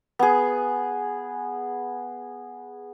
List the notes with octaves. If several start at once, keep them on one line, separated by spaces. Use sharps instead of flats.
B3 G#4